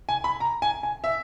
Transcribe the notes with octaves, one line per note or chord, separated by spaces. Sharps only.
G#5
B5
A#5
G#5
G#5
E5